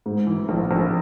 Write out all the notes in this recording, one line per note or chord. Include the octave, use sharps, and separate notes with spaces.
G#2
E3
A#1
A#1